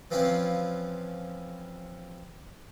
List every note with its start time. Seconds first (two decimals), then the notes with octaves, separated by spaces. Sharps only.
0.11 E3 F3 C4 C#4 E4 F4